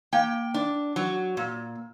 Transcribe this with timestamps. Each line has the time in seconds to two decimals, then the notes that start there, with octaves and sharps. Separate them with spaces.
0.13 A#3 G5
0.54 D4
0.96 F#3
1.37 A#2